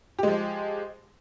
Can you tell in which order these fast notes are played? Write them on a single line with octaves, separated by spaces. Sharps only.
G4 G#3 F3